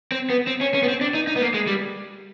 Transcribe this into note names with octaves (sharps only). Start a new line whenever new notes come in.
C4
B3
C4
C#4
C#4
B3
C4
D4
D#4
D#4
B3
A#3
G#3
G3